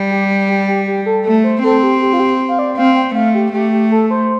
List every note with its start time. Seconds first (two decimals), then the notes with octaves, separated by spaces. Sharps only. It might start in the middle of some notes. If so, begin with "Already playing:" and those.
Already playing: G3
0.11 G4
0.49 G4
0.68 G4
0.87 G4
1.06 A4
1.25 A3 A4
1.44 C5
1.63 C4 A4
1.83 G4
2.01 G4
2.13 F4
2.20 G4
2.49 F5
2.59 D5
2.78 C4 F5
2.96 G5
3.15 A3 F5
3.35 G4
3.53 A3 G4
3.72 G4
3.92 A4
4.10 C5